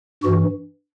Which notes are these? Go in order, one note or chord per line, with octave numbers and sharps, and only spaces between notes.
G2 E3 F#4